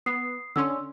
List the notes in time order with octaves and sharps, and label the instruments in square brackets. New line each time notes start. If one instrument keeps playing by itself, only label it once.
[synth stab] B3 [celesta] D#6 C7
[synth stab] D3 C#4 [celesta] C6 E6